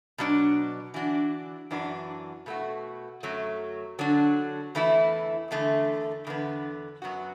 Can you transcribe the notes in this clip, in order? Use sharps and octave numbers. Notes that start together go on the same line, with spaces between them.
B2 F#3 D4
E3 D4 F#4
F#2 E3 D4 F#4
B2 A3 F#4
F#2 F#3 A3
D3 F#3 D4 F#4
E2 E3 A3 E4
E2 D3 A3
E2 D3 B3
F#2 F#3 B3 F#4